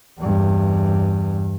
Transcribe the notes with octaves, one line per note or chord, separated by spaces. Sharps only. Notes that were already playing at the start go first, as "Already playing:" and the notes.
E2 G2